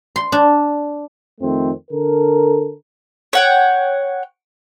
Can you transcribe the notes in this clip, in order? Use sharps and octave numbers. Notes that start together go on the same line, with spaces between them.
C6
D4
F2 D#3 A3 C4
D3 A4 A#4
C#5 F#5 G5